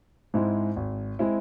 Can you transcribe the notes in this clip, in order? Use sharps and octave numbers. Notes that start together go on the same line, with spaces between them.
G#2 G#3 C4 E4
G#1
G#3 C4 E4